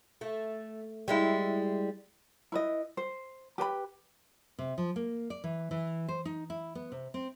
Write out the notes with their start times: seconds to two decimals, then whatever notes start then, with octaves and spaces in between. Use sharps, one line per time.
0.21 A3
1.08 G3 G#3 E4
2.52 E4 B4 D#5
2.97 C5
3.58 G4 B4 G#5 B5
4.59 C3
4.78 F3
4.96 A#3
5.30 D5
5.44 E3
5.71 E3
6.08 C5
6.25 D#4
6.50 E4
6.75 B3
6.92 C3
7.14 C4